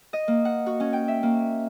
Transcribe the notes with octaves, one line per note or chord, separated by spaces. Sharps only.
D#5
A#3
F#5
F#4
C#4
G5
E5
A#3